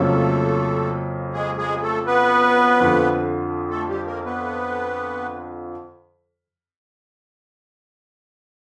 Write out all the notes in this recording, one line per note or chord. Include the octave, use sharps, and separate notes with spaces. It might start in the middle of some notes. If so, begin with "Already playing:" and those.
Already playing: F2 C#3 F#3 A3 A#3 C#4 A4
G#3 G#4
G#3 G#4
A3 A4
B3 B4
F2 D3 F3
A3 A4
G3 G4
A#3 A#4
B3 B4